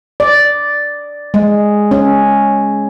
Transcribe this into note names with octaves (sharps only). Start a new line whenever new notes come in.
D5
G#3
C#4